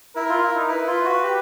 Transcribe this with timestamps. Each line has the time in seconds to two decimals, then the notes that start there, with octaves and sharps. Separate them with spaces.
0.16 E4 A#4
0.29 F4
0.43 E4
0.56 D#4
0.69 E4 B4
0.87 F4
1.05 F#4
1.23 G4